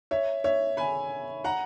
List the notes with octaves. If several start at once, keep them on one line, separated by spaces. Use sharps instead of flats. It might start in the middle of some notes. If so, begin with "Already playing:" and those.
C#5 E5
C#5 E5
G#5 B5
F#5 A#5